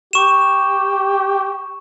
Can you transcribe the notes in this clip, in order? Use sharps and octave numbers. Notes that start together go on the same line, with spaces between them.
G4 C#6 E7